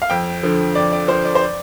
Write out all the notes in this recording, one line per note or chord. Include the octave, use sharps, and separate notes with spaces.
F5
F2 G5
D3 F3
F2 D5
D5
D3 F3 C5
D5
C5
D5